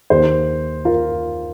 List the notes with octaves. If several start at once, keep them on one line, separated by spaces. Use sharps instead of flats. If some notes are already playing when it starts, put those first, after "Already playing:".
D#2 D#3 A#3 G4 C5
F4 A#4